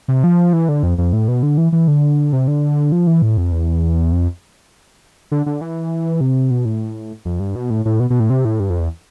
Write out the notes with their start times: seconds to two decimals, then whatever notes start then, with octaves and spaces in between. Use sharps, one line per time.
0.08 C3
0.24 F3
0.53 E3
0.69 D3
0.83 F2
0.98 F2
1.13 A2
1.28 B2
1.43 D3
1.58 E3
1.72 E3
1.88 D3
2.33 C3
2.48 D3
2.92 F3
3.07 E3
3.22 A2
3.37 F2
3.52 E2
4.12 F2
5.32 D3
5.46 D3
5.61 E3
6.21 C3
6.51 B2
6.65 A2
7.25 F2
7.40 G2
7.55 B2
7.70 A2
7.85 A2
8.00 B2
8.10 B2
8.20 A2
8.30 C3
8.45 A2
8.60 G2
8.70 F2
8.80 E2